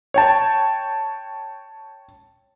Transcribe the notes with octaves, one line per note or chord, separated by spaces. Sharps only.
C#5 G5 A5